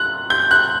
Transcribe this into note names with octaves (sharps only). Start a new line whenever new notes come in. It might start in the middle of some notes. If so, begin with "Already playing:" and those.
Already playing: F#6
G6
F#6